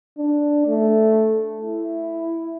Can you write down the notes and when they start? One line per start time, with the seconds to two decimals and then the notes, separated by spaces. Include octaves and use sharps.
0.18 D4
0.68 A3
1.62 E4